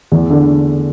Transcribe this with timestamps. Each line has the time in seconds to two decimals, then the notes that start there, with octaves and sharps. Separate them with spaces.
0.12 E2
0.30 D3